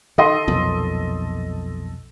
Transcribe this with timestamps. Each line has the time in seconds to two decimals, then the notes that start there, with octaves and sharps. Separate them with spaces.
0.18 D#3 A4 D#5 C6
0.48 B1 F2 A#2